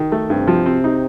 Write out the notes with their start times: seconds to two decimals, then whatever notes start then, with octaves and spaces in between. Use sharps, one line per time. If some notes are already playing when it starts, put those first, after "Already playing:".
Already playing: D#3
0.12 A3
0.30 G2 C3
0.48 F3
0.66 C4
0.84 D#4